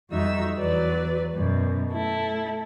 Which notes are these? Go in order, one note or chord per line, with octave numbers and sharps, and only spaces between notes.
F2 G3 D#4 F#4 E5 E6
E2 F#3 B4 D5
F#2 B2
A3 E4 A4